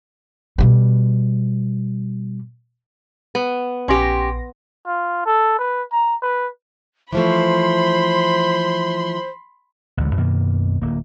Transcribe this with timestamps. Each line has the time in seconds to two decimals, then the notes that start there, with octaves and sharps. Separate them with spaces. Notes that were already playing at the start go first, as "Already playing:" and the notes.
0.58 B2 G3
3.35 B3
3.88 A#1 C#4 G4 C6 A#6
4.86 F4
5.26 A4
5.59 B4
5.92 A#5
6.22 B4
7.13 E3 F3 A3 C5 B5 C6
9.97 A1 D2 D3 G#3
10.17 F#2 B2 D#3 A#3
10.82 D1 A#3